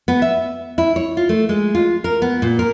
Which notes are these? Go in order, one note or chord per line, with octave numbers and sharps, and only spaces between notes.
B3
E5
E4
C#5
F4
A3
G#3
F4
A#4
B3
A#2
A#4